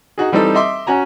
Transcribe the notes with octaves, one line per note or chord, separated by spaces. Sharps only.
D#4 F#4 G#4
E3 G3 C4 D#4 A4
D#5 E5 C6 D6
C#4 F#4 G#5 A#5